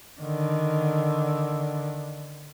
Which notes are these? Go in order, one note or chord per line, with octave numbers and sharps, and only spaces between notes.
D3 D#3